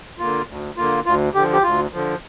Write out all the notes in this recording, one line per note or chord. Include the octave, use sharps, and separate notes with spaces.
D3 A#3 F4
D2
D3 A#3 F4
D2 F4
D3 F3 G4
G4
D2 F4
D3 F3